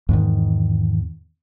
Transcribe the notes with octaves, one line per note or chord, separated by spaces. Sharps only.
E2 G#2 D#3